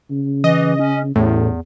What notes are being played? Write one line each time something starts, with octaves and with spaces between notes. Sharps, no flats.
C#3
E3 D#5
C#4
A1 E2 A2